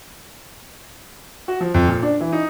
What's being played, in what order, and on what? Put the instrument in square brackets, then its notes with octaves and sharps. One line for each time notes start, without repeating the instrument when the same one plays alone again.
[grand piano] F#4
F3
F2
A#2
D4
E3
D#4